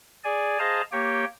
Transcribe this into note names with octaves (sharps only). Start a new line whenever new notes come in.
G#4 D5 G#5
G#4 C5 D#5 F5 A5 A#5
A#3 G4 C#5 G5